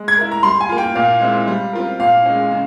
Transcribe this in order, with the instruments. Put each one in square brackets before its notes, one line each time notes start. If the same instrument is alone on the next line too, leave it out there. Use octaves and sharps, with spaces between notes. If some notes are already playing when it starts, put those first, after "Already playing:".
Already playing: [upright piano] G#3
[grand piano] G#6
[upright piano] E4 A#4
[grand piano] A#5
[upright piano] G3 [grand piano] C6
[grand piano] G#5
[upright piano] A#3 F4
[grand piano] G5
[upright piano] A#2 [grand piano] F5
[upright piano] G#3 C4 E4
G3
C4 F4 A#4
[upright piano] A#2 [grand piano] F5
[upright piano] G#3 C#4
C#3